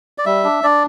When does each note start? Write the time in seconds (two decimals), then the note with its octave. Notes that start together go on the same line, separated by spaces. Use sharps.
0.18 D5
0.26 G3 E5
0.44 D4
0.63 D4 D5